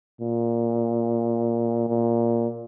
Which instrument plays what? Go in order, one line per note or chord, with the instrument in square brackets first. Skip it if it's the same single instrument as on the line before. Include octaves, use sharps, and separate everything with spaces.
[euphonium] A#2
A#2